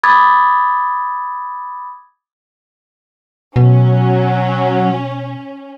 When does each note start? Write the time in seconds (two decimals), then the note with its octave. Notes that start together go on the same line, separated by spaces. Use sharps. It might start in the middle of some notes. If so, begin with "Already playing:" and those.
0.03 B5 D6 D#6 G#6 A6
3.56 B2 F#3 C#4